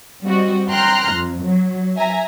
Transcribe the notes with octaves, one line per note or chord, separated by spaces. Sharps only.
G3 C4 F#4 D#5
G5 A#5 C6 F6 F#6
F2
F#3
E5 G#5 A#5